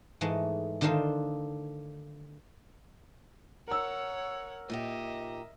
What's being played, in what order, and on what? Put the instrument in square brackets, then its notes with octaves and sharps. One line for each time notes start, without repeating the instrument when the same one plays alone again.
[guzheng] G#2 E3 G#3 A3
D3 D#3 D4 D#4 F4 C5
[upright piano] A#4 E6 [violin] C#5 F#5
[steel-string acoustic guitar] A#2 D#4 G4 [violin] D#5 E5